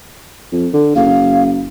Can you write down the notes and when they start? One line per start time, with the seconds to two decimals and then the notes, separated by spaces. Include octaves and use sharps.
0.52 F2
0.73 D3
0.96 F#1 F5